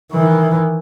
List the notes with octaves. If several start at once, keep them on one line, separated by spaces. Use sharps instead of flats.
D#3 E3